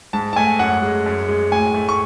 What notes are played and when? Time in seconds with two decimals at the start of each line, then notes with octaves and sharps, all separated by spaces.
0.13 G#2 A5
0.33 A5
0.36 A3 G#5
0.59 F#2 F#5
0.82 G#3
1.06 F#2
1.28 G#3
1.52 A2 G#5
1.74 A3
1.89 C#6